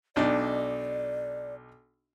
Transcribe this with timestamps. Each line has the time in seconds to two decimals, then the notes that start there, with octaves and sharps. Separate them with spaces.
0.16 B1 D4 D#4 D5